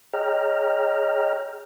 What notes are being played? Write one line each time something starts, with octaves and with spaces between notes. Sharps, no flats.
G#4 C#5 D#5 G5 A#5 F6